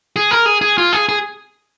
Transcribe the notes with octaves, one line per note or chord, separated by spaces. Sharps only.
G#4
A#4
G#4
G#4
F4
G#4
G#4